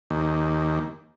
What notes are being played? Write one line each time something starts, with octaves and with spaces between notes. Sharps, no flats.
D#2